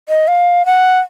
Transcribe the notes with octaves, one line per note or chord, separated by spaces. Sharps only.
D#5
F5
F#5